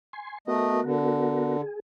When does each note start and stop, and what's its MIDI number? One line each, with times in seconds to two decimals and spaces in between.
0.13 0.38 80
0.13 0.38 84
0.47 0.80 57
0.47 1.57 59
0.47 1.57 66
0.47 1.57 70
0.47 0.80 75
0.84 1.61 50
1.61 1.80 68